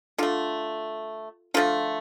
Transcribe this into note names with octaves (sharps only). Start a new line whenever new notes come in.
D3 A3 F4
D3 F3 A3 F4